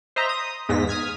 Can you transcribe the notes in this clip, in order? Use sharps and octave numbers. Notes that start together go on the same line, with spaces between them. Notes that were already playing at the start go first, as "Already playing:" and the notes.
C5 D#5 E5 A#5
D#6
E2 G#2 A#6 B6
D#6 F6 G#6 B6